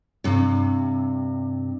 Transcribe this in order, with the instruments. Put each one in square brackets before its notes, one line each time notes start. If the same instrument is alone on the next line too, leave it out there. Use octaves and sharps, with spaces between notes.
[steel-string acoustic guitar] G2 C3